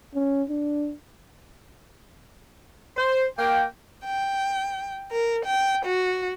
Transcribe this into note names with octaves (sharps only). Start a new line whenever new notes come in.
C#4
D4
C5
A#3 G5
G5
A#4
G5
F#4